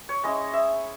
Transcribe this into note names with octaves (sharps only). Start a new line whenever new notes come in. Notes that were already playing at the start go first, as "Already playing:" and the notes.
C#5
G#3 C#4 E4 D#5
E5